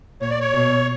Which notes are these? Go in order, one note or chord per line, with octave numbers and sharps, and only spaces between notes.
A#2 C#5
D5
C#5
B2